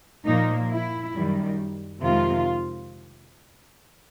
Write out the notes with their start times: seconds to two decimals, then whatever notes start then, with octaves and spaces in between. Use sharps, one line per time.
0.26 A#2 F3 A#3 D#4
0.71 E4
1.14 F#2 D#3 G3
2.02 F2 C3 D#3 G#3 F4